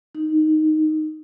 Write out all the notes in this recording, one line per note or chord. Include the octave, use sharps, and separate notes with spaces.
D#4